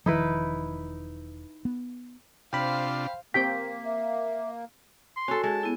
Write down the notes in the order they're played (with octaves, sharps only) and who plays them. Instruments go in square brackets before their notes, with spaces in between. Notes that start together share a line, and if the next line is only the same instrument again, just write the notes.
[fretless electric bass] E1 D#3 F3 [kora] D#4 E4 B4
[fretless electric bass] B3
[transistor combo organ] C3 D4 F4 [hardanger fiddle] C5 F5 [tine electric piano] G5 B5
[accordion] A#3 [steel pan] C4 G4 G5 [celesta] B6
[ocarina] E5
[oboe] C6
[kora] C#4 A4 [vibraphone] F#4
[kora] G#3 [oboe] A5
[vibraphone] B3 E4 A4